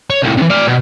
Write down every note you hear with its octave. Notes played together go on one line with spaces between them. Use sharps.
C#5
C2 A2
C3 E3
D5 F5
B2